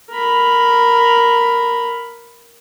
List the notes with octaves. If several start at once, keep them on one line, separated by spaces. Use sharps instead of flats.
A#4 B5